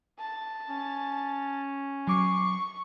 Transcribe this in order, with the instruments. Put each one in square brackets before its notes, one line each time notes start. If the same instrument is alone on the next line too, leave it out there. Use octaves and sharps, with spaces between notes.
[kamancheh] A5
[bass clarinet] C#4
[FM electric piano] F#3 D6 C7 [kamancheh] C#6